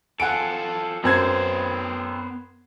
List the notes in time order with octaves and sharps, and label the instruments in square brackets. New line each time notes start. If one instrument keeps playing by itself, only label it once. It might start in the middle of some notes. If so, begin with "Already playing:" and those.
[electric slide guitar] F4 A4 [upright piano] F#5 G#5 D7
[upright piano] F#2 C4 G#6 [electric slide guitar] B3 C5